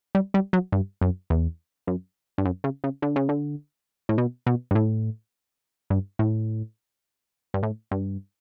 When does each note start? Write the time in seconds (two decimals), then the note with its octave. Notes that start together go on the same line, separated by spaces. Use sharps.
0.15 G3
0.34 G3
0.53 F#3
0.72 G2
1.01 F#2
1.30 E2
1.87 F#2
2.38 G2
2.45 F#2
2.64 C#3
2.84 C#3
3.02 D3
3.16 C#3
3.29 D3
4.09 A2
4.18 B2
4.47 B2
4.71 G2
4.75 A2
5.90 G2
6.19 A2
7.54 G2
7.63 A2
7.91 G2